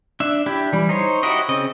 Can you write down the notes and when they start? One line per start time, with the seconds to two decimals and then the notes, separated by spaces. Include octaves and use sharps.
0.20 D4 E5
0.46 D4 E4 G4
0.73 E3 G3
0.89 D#4 C5 C#5
1.23 E4 F#4 G4 D#5
1.49 C#3 C4 D#5